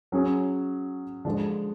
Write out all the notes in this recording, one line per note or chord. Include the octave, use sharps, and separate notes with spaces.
F#3 C#4 G#4 C#5
D3 F3 G#3 D4